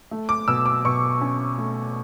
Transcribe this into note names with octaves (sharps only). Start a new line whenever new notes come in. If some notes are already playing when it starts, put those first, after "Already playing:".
A3
D6
B2 E6
D6
B2 C#6
C#4
A3